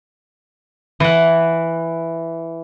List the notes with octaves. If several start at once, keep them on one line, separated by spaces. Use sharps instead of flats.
E3 F#5